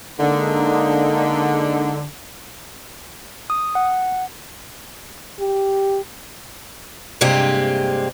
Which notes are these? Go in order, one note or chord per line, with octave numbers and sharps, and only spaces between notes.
D3 G#3 A#3 D#4
D#6
F#5
G4
G2 C3 G#3 A#3 C4 G4